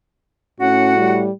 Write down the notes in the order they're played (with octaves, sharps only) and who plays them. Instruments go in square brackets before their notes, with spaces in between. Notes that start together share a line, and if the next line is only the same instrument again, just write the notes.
[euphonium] A2 [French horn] C#4 [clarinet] F#4 [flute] F#5
[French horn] G3